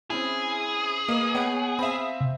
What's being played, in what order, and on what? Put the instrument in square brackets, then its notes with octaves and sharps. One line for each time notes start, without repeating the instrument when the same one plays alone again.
[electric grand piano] C4 C#4 E4 [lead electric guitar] G#4
[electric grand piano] A#3 [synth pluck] B4 D#5
[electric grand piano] B3 [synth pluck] C#5 F#5 G5
[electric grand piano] C4 E5 [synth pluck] F5 B5
[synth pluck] C3